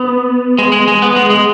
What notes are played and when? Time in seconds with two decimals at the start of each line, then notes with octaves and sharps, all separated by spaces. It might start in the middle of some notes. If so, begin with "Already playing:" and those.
Already playing: B3
0.58 G#3
0.72 G#3
0.88 G#3
1.02 B3
1.16 G#3
1.30 G#3